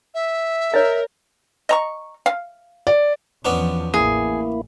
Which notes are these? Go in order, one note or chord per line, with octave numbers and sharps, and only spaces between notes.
E5
A#4 C#5 D#5
D#5 A#5 C#6
F5
D5
E2 F3 B3 C#4 D4
A1 A#3 E4 G#4